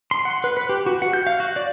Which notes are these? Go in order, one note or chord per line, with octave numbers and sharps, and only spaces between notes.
C6
F#5
B4
B4
G4
F#4
F#5
G6
F5
F#4
D5